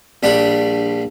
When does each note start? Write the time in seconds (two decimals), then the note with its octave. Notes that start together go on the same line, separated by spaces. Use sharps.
0.23 A#1 G3 D4 B5